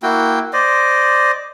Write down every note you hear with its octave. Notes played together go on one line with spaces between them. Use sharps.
A#3 E4 F#4 G5
C5 D5 D#5